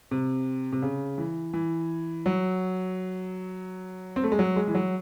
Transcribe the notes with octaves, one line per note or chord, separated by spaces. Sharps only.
C3
C3
C#3
E3
E3
F#3
C4
A3
G#3
F#3
G#3
E3
F#3